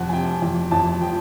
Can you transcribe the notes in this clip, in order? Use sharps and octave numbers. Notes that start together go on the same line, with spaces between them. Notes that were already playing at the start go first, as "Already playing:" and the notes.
Already playing: F2 C3 F#5
G#5
C3 G5
F2
F2 A5
F3 G5